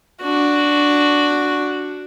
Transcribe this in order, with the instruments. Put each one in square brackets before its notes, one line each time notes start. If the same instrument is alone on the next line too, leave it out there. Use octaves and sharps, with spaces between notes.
[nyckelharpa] D4 F#4